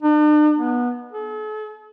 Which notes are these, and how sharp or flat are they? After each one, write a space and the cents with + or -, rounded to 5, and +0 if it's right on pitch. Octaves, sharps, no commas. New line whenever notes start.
D4 +45
B3 -20
A4 -45